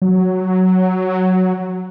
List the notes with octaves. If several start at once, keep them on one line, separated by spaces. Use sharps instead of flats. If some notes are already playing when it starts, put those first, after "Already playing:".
F#3